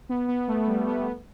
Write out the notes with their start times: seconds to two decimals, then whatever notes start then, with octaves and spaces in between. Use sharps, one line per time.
0.09 B3
0.28 B3
0.48 A3
0.68 G3
0.87 B3
1.06 B3